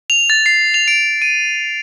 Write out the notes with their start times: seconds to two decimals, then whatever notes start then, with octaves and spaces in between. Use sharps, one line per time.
0.10 F7
0.30 A6
0.46 C7
0.74 F7
0.88 D7
1.22 D#7